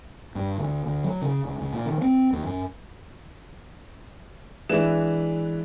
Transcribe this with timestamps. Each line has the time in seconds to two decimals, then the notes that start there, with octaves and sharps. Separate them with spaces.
0.35 G2
0.58 D2
0.86 D2
1.04 F#3
1.22 C#3
1.46 C#2
1.61 C#2
1.72 A#2
1.86 D#3
2.02 C4
2.32 D#2
2.46 F#2
4.69 E3 G#3 D4 B4 E5 E7